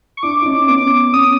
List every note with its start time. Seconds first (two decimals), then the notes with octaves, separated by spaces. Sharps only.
0.17 C#6
0.23 D4 E4 D6
0.42 E4
0.45 C#4 D#4
0.68 B3 C#4 D6
1.13 B3 C#4 D#6